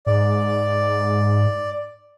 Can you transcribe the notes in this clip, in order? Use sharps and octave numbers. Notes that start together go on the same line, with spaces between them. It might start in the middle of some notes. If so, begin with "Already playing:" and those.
G#2 D5